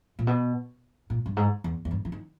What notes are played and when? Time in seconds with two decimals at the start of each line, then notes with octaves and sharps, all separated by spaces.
0.19 A#2
0.27 B2
1.10 A#2
1.26 G2
1.37 G#2
1.64 E2
1.85 E2
1.91 G2
2.05 E3
2.12 D#3